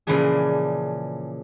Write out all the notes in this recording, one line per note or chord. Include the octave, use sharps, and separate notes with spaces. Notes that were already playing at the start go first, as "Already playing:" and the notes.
A#2 C#3 E3 F3 D4 G#4